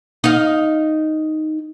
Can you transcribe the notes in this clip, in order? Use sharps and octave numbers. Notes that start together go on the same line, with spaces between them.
D#4 F5